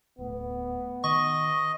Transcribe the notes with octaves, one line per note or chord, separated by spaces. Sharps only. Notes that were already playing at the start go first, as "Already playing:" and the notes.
D1 A2 B3
D#3 D#5 C#6